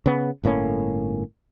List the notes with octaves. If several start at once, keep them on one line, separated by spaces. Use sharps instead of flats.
C#3 B3
G1 A2 A#3 C#4